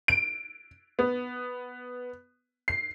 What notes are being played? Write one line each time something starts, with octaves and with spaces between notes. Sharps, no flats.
D7
B3
C7